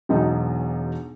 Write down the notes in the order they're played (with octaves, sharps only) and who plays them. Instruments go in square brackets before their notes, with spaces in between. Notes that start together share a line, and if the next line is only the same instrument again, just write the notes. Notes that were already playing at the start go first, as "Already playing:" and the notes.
[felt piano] E1 B1 D#4